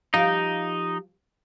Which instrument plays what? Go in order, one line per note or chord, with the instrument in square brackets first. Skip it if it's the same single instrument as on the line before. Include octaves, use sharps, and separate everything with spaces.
[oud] F3 G4 F5 [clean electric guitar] D#4